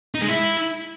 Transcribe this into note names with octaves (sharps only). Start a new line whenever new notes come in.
D#4
G#3
E4